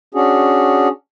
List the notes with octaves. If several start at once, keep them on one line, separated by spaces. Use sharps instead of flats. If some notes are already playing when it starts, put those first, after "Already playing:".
C#4 D4 F#4 G#4